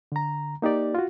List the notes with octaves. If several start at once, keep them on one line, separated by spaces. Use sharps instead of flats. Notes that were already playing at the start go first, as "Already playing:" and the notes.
D3 A#5
A#3 D#4 G4 D5
F4 F#4